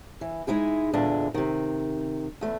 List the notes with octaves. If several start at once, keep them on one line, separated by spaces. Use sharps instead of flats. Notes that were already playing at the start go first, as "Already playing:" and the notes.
E3
G#3 D#4 E4 G#4
E2 A#2 D3 G#3 D4
C3 D#3
E2 A3